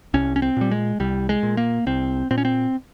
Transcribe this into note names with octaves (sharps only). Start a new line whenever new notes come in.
C2 C#4
C#4
C4
A#2 G3
G#3
C2 G3
G#3
A#2
A#3
C2 C4
A#2 C4
C#4
C4